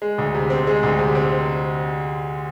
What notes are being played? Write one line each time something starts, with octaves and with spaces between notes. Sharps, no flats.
G#3
D2
C3
C4
G#3
D2
C3
C4